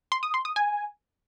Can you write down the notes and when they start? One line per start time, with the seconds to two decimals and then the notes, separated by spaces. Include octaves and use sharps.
0.12 C6
0.23 D#6
0.34 C6
0.45 D#6
0.56 G#5